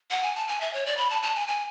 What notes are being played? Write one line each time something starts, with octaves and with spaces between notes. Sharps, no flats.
F#5
G#5
A5
G#5
E5
C#5
D5
B5
A5
A5
G#5
G#5